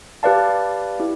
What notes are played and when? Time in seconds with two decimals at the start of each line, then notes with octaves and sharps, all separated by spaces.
0.23 G4 B4 D5 F5 A5
1.00 E4 G4